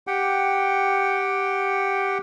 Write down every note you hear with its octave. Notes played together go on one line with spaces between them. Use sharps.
G4 F#5 G5